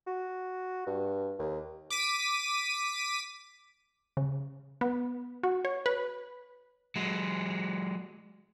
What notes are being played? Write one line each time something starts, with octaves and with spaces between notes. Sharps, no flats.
F#4
G2
D#2
D6 B6 D#7
C#3
B3
F#4
C#5
B4
F#3 G#3